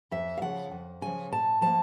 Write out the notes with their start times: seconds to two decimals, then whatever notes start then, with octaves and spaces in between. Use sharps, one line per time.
0.11 F2 E5
0.38 F5
0.41 C#3 F3 F#5
0.71 F2
1.01 C#3 F3 G#5
1.32 A#2 A5
1.61 F3 A#3 A5